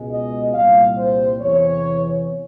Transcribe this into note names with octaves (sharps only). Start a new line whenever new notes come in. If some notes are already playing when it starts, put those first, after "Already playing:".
Already playing: C#2 B2 G#3
D#5
C2 A#2 G3 F5
C5
E2 C3 E3 C#5